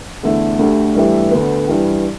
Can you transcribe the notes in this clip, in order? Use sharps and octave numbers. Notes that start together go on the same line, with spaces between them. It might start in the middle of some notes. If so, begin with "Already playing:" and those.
E2 D3 A3 E4
D2 D3 A3 G4
G2 E3 A3 G4 E5
D2 D3 B3
G2 E3 G3